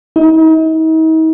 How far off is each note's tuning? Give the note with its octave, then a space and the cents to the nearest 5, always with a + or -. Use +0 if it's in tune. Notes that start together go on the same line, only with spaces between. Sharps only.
D#4 +45